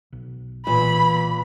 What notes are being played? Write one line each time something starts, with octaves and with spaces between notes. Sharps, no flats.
B1
A#2 E3 B5